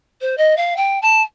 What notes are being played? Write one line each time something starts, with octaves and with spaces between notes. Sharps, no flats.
C5
D#5
F5
G5
A5